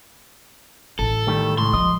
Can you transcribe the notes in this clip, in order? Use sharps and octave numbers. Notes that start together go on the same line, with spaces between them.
A1 A4
D#3 G3 A3
C#2 A2 C6
F3 D#5